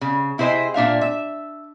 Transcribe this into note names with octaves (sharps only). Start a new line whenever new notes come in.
C#3
C3 E4 G#4 C5 D#5 G5
A#2 D4 E5 F5
E5